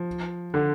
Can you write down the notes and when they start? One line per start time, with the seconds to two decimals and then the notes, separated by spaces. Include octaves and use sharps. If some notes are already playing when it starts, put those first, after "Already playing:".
Already playing: F3
0.54 D3